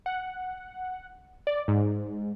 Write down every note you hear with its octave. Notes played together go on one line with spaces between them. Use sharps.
F#5
D5
G#2